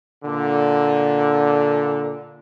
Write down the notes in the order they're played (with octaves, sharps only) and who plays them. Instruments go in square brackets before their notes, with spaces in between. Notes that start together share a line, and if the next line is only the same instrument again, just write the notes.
[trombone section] A#2 D3